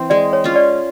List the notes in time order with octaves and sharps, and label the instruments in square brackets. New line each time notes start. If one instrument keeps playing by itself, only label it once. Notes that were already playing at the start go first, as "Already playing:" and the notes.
Already playing: [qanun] E3 C4
[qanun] G#3 [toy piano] D5
[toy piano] C#5
[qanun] C#4 F4
[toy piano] D5